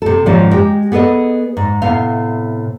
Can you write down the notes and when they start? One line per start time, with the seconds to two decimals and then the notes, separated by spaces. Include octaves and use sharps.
0.02 C3 A4
0.26 G#2 D#3 F3 G3 C#4 F4
0.51 G#3 G4 G5
0.92 B3 G#4 A4 B4 D#5
1.57 G#2
1.82 A2 C3 B3 F5